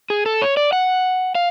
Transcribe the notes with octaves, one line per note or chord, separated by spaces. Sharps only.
G#4
A4
C#5
D5
F#5
F5